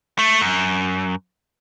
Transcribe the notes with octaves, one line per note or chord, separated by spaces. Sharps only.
A3
F#2